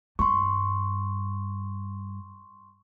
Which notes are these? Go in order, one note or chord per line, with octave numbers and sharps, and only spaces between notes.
G2 C6 C#6